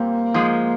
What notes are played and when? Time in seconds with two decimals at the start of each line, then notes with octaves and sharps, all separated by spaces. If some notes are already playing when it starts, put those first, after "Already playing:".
Already playing: A#2 G3 A#3 C4
0.34 G#2 F3 G#3